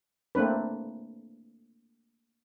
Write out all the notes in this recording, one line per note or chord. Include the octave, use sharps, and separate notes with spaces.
A3 A#3 C4 D4 B4